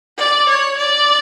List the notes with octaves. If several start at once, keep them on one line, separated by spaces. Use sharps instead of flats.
D5
C#5
D5